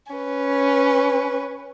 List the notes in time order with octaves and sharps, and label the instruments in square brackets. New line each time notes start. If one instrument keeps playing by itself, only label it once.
[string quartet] C#4 B4